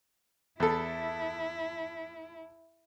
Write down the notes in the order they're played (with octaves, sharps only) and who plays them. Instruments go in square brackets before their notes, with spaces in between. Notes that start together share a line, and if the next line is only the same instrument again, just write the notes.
[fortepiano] E2 A4 [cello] E4